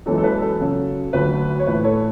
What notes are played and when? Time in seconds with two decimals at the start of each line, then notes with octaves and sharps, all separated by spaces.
0.06 F#2 E3 G#3 A4
0.18 A4
0.24 B4
0.42 A4
0.60 F#2 C#3 F#3
1.13 D2 D3 F#3 B4
1.60 C#5
1.67 A2 E3 A3 B4
1.84 A4 C#5